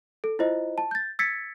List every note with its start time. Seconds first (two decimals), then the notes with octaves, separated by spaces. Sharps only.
0.24 A4
0.39 E4 F4 C5 D#5
0.78 A5
0.91 G6 A6
1.19 E6 G#6 A6 B6 C#7